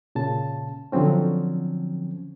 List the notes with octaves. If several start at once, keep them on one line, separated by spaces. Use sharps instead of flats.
A#2 C#3 A5
D3 F3 F#3 C4 C#4